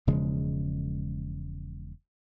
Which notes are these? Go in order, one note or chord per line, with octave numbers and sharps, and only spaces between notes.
E1 C#3 F3 G#3